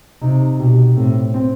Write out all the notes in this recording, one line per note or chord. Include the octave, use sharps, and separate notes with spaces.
C3 D#4
B2 G4
A2 C4
C4